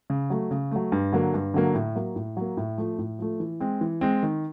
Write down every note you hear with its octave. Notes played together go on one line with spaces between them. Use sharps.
C#3
F#3 A3
C#3
F#3 A3
G2
D3 F#3 A#3
G2
D3 F#3 A#3
A2
F#3 A#3
A2
F#3 A#3
A2
F3 A3
A2
F3 A3
E3
G#3 C4
E3
G#3 C4
D#3